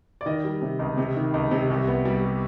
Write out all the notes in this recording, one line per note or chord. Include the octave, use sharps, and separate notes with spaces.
D5
D#3 D#5
G3
C3
C#2
C3
D#3
C#2
C3
C2
B3
G3